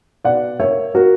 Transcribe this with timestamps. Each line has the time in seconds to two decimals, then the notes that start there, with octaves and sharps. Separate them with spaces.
0.24 B2 D5 F#5
0.60 A#3 C#5 E5
0.94 A#3 F#4 A#4